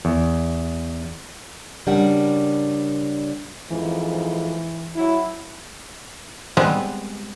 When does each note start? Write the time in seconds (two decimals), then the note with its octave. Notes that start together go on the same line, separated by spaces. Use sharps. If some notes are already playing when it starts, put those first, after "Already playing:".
0.05 E2
1.87 C#3 G3 D4 A#4 F#5
3.71 F2 G#2 E3
4.96 F#3 E4
6.57 G3 G#3 B3 C4